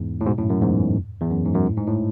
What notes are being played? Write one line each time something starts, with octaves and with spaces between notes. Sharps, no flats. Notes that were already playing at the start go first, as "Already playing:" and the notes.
Already playing: E2 G#2
A2
G#2 B2
F#2 A2
F#2
E2 G#2
E2
F#2
G#2
F#2
A2
G#2
A2